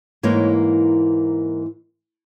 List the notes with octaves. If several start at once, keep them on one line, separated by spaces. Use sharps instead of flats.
G#2 E3 A#3 D#4 C#5